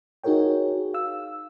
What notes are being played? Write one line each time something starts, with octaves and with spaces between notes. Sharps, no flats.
D#4 F#4 G#4 A#4 C#5 G5
F5 E6